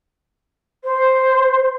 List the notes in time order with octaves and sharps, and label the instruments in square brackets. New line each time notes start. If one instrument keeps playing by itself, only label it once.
[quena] C5